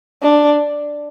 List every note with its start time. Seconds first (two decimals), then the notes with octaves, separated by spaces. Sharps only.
0.22 D4